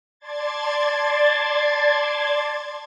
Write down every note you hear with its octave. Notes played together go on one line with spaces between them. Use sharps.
D5 A5 C6 G#6 A6